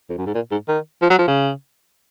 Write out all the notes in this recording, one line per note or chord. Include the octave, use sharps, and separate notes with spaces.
F2
F#2
G#2
A#2
G#2
D#3
F3
F#3
F3
C#3